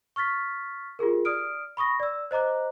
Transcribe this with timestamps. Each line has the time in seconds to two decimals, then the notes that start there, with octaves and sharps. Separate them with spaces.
0.16 C#6 F6 A6 B6
0.99 F4 G4 G#4 A#4
1.25 D5 D#6 F6 D7
1.77 B5 C#6 D#6 A#6
2.00 D5 E6
2.31 C5 D#5 A#5 D6 F#6